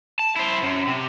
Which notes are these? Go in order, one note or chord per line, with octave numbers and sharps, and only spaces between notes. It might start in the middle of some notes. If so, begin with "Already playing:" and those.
A5
E4 C5
F#2
C3